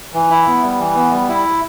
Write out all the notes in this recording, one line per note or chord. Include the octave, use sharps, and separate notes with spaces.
E3
E4
B3
G3
E3
B3
G3
E4